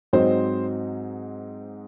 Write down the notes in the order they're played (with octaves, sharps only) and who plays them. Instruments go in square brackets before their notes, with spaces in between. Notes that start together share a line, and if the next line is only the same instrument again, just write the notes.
[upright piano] G#2 F#3 C4 D#4 C5